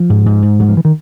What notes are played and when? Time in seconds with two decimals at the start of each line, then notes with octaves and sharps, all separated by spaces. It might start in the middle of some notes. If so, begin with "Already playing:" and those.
Already playing: F3
0.10 G#2
0.26 G#2
0.42 G#2
0.59 G#2 F#3
0.68 F3
0.77 E3
0.85 D#3